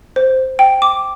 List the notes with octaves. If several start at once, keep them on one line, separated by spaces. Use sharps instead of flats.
C5
G5
D6